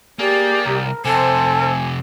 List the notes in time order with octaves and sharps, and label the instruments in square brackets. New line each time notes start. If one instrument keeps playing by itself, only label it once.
[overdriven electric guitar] A#3 [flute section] G4 [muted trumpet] G#4 [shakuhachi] D5
[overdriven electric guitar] C2 [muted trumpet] A#4
[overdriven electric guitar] F2 C3 [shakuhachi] A4 [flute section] C5 [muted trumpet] G#5